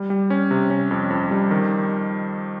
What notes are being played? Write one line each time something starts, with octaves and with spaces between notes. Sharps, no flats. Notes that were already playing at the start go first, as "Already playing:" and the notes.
Already playing: G3
G3
C#4
C3
C#4
F2
F2
G3
D#3